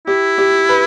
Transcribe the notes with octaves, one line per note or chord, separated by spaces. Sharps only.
E4 G4
G4
B4